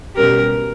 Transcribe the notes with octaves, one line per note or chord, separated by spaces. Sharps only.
B2 G3 C#4 G4 A#4